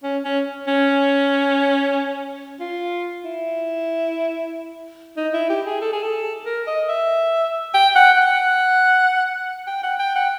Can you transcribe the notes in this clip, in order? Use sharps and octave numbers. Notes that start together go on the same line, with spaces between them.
C#4
C#4
C#4
F4
E4
D#4
E4
G4
G#4
A4
G#4
A4
A#4
D#5
E5
G5
F#5
F#5
G5
F#5
G5
F#5